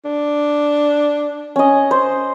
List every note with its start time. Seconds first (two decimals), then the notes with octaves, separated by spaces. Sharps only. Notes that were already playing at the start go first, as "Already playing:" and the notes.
0.05 D4
1.56 C#4 D#5
1.91 C5